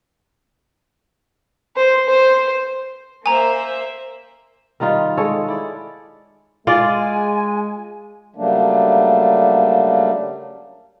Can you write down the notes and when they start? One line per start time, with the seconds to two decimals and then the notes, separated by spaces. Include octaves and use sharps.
1.76 C5
2.08 C5
3.26 A#3 C5 E5 G#5 A#5
4.80 D#3 G3 D#4 F4
5.17 G#3 A4 C#5
5.48 E4 D5
6.67 G#3 F4 D5 G#5
8.36 C#3 F#3 G3 A3 A#3 D4